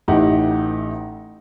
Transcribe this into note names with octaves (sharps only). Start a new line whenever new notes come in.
A1 A3 D#4 G4 F#5